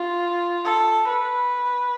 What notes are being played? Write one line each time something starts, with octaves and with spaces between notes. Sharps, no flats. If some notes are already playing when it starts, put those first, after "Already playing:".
Already playing: F4
A4
B4